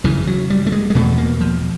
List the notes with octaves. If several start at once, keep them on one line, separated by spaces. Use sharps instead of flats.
F#2 C#3 E3
F#3
G3
A3
G#3
G#3
E2 B2 A3
A#3
F3